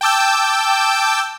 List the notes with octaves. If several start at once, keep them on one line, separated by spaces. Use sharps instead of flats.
G5 A5 D6 E6 G6